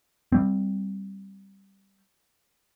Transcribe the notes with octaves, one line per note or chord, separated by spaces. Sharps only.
G3 C4